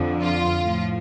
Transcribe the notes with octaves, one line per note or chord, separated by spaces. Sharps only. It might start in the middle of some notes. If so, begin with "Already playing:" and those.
Already playing: F2 D3 F3
F4
A2 F3